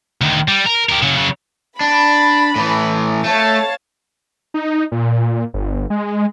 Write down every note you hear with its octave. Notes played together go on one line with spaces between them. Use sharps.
D2 D#3
G3
A#4
G4 A#4
C#3 F#3
C#3 F#3
D4 B5
A2 E3
A3 C#5 F5 A5
D#4
A#2
G1
G#3